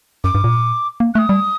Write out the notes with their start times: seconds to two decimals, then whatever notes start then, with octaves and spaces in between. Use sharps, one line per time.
0.24 F#2 D6
0.35 G2
0.44 A#2
1.00 A#3
1.14 A3 D#6 F#6
1.29 G3